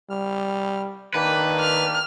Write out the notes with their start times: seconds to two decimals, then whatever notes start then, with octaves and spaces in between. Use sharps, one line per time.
0.10 G3 F6
1.14 D#3 A#3 D4 G4 B4
1.60 F6